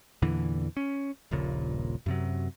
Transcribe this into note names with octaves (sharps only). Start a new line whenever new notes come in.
E2 A#2 D3 E3
C#4
D#1 A#1 A#2 C#3
F#2 C3 F#3